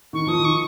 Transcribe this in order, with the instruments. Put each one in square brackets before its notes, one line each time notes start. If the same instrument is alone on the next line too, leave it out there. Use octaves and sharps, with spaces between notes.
[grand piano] D#3 [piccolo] C#6
[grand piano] F3 [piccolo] D#6
[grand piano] D#3
[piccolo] C#6